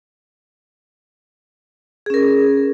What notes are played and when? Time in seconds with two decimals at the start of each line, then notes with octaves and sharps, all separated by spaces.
2.06 G#4
2.10 C#4
2.14 A#4